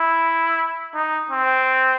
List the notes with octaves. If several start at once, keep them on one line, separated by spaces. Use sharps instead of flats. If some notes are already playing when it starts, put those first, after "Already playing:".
Already playing: E4
D#4
C4